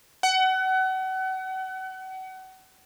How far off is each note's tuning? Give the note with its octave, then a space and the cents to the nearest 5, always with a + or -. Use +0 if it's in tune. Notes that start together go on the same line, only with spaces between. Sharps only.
F#5 +30